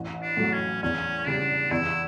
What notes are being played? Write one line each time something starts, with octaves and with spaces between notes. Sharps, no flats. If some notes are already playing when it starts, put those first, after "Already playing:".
Already playing: A1
D4
A2 F#3 A3
C#4
E2 C#4
C#3 G3 D4
E2 E4